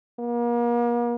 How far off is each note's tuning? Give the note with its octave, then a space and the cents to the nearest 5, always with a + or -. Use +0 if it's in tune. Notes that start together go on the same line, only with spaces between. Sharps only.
A#3 +40